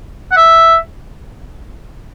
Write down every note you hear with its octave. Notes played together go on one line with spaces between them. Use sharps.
F#5
E5